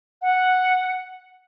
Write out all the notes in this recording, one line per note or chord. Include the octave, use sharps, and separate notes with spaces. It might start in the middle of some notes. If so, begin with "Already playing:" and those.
F#5